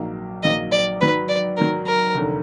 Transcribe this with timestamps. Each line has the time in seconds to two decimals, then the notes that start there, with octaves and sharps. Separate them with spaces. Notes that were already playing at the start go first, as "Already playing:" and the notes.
Already playing: A#1 G#2 F#3 A#3 D#4
0.43 A#1 G#2 F#3 A#3 D#4 D#5
0.72 D5
1.01 G#2 D#3 F#3 B4
1.29 D5
1.57 G#2 D#3 F#3 A#4
1.87 A#4
2.15 F1 D#2 D3